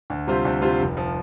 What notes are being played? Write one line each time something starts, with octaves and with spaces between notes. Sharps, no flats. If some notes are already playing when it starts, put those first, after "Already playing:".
D2
C3 G3 F4 C5
D2
C3 G3 F4 C5
F1
F3